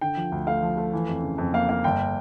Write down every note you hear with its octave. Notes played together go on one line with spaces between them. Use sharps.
D3 G5
F3
D2
A3 F5
F3
A3
E3
F2
C#3
F2
A#3 F5
A#3 F5
G1 G5